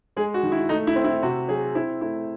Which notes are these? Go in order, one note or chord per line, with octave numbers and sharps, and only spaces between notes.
G#3 G#4
F#4
D#3
E4
A3 D#4
E4
C4
E4
C3 F#4
F#3 G#4
C4 E4
A3 E4